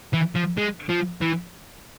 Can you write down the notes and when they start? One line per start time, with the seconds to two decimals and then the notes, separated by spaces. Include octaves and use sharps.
0.13 E3
0.35 F3
0.57 G#3
0.89 F3
1.22 E3